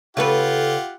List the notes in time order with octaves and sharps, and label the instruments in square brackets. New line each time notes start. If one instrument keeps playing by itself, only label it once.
[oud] C#3 A4 B4 [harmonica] F4 G4 F#5